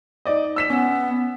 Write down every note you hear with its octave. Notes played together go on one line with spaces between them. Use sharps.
D#4 D5 D#5
E6 B6 E7
B3 C#4